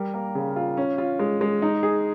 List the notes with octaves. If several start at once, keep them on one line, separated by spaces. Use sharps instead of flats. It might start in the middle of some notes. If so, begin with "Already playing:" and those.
Already playing: G3 A#4
A#3
C#3
F4
C#4
F4
G#3
G#3
D#4
G#4